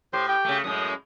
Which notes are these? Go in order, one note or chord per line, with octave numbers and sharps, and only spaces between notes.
A2 G4 C5 C6
G4 G5
C#3 A3
F#2 A2 G#3 D#6